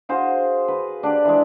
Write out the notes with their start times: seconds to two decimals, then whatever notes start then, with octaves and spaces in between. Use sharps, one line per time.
0.09 F#4 G#4 C5 F5
0.68 B4
1.03 D4 G4 D5
1.25 E3 G#3